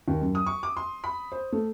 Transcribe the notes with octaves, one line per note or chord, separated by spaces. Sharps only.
D#2
F#2
D#6
C#6
D6
C6
B5
C5
A3